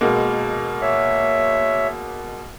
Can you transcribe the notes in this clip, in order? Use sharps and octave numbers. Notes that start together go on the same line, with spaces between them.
B2 G#3 A#3
C#5 E5